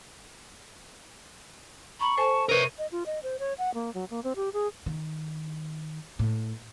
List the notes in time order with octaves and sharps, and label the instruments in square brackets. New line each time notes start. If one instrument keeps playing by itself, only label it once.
[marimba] A#5 [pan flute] B5 [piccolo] C#6
[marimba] A4 C5 G#5 [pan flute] A5
[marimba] C3 [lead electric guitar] A#4 C#5 [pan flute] B4 [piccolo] D#7
[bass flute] D#5
F4
D#5
C5
C#5
F#5
A#3
F#3
A#3
C4
G4
G#4
[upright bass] D#3
A2